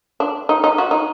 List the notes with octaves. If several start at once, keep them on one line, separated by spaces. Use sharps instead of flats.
D4
D#4
D#4
F#4
D#4